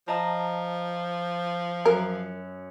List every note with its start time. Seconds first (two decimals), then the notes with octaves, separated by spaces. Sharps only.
0.08 F3 D#5 A5 A#5
1.85 F#2 A#4